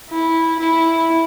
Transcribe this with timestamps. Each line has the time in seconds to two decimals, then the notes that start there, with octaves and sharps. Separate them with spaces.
0.10 E4
0.59 E4